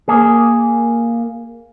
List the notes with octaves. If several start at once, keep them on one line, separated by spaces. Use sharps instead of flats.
A#3 G#4